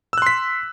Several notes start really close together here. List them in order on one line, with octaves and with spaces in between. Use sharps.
E6 F#6 C6 B6